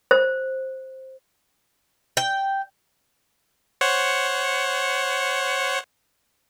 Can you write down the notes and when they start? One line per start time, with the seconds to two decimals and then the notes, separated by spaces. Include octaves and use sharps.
0.11 C5
2.17 G5
3.81 C5 C#5 F#5